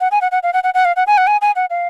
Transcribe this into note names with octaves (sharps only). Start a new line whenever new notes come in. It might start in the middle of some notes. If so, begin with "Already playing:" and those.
F#5
G#5
F#5
F#5
F5
F#5
F#5
F#5
F5
F#5
G#5
F#5
G#5
G#5
F#5
F5